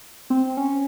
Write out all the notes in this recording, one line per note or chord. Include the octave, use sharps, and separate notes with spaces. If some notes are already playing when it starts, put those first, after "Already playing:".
C4
C#4